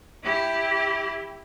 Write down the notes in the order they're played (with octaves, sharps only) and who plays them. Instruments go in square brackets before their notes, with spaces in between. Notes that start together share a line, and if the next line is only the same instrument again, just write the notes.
[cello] E4 G4